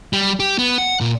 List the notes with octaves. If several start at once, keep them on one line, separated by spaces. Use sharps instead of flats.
G3
G4
B3
F#5
A#2